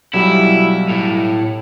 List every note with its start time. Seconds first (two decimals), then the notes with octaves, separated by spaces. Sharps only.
0.13 B1 F#3 G3 E4
0.89 A2